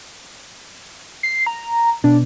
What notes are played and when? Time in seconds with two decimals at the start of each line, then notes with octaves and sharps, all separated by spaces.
1.23 C7
1.47 A#5
2.04 B2 D4